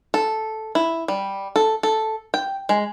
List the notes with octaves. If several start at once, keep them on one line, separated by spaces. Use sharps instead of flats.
A4
E4
G3
A4
A4
G5
G#3